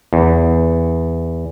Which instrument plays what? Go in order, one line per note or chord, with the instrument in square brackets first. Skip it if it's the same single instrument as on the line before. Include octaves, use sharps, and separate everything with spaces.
[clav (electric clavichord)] E2